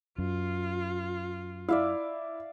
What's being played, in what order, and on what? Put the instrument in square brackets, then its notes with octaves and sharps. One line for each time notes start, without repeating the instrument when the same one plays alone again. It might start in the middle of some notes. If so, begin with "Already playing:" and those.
[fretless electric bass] F#2 [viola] F4
[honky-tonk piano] E4 [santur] D5 E5 F5